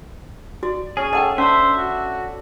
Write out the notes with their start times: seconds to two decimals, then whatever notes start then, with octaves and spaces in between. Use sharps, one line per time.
0.63 F#4 D5
0.97 C#4 G#4
1.13 A3 D#5 F#5 G5 A5
1.38 C#4 D4 C5 E5 B5
1.77 F#4